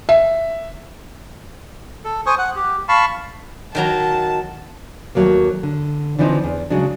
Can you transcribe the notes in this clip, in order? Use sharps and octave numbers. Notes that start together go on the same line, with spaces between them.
E5
A4
C5 G#5 C#6 D#6
F#5
G4
F5 A5 B5 C#6
D#3 F#3 A5 A#5
D#2 F#3 A3 A#3
D3
D3 E3 F3 C4 D#4
E2
C#3 F#3 G#3 D4